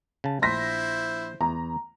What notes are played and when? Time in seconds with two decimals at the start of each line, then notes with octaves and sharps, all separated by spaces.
0.24 C#3 A5
0.42 A#1 E4 C5 C6 A#6 B6
1.41 E2 A#5